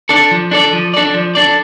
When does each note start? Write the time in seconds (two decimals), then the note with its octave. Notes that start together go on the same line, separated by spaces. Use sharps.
0.09 D4 A4 D5
0.31 F3
0.51 D4 A4 D5
0.73 F3
0.94 D4 A4 D5
1.14 F3
1.35 D4 A4 D5